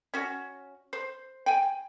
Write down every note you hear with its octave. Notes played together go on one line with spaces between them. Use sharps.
C#4 F#4
C5
G5 G#5